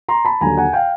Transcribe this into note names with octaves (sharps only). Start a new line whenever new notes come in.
A#5 C6
A5 B5
D#2 D3 F#3 G#5 A#5
F#5 G#5
F5 G5